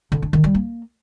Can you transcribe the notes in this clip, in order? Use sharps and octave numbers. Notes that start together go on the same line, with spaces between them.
D3
D4
D#3
G3
A#3